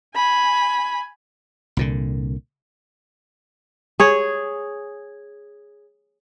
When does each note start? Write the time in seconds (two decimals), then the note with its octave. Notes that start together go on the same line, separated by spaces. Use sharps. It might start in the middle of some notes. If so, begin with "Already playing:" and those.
0.15 G#5 B5
1.77 C2 A#2 D3
4.00 G#4 C#5